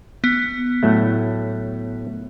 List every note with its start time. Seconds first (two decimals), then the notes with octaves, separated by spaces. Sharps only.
0.24 B3
0.83 A2 F#3 A3